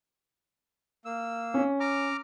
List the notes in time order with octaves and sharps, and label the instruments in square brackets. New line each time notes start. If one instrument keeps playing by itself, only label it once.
[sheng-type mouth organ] A#3 E6
[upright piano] C#4
[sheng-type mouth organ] A#5 D6 F6